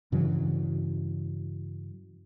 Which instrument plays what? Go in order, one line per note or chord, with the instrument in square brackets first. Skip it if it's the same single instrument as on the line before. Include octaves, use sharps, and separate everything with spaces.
[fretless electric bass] G2 C#3 E3 F#3